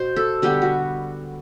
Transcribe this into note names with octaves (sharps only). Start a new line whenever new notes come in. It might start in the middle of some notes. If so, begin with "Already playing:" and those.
Already playing: B2 C5
A4
D3 G3 B3 G4
F#4